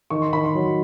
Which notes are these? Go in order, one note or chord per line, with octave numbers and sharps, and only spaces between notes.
D#3 C#6
C6
D#3 B5
C6
F#3